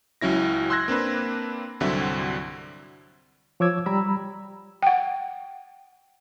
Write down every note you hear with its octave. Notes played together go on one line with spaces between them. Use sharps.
C#2 F#3 C#4 E4 A#6
C6 E6 F#6 G#6 A#6
A#3 C4 D4 B4
C2 G2 D3 F#3 C4 E5
F3 C#5 D6 E6 G#6
G3 A#5 B5 E6
F#5 G5